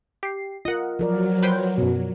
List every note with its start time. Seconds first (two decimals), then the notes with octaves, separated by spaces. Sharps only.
0.23 G4 C7
0.65 F4 A#4 D#5 F#5
0.99 F3 F#3 A#4 D5
1.43 B4 C5 G5
1.78 F#2 B2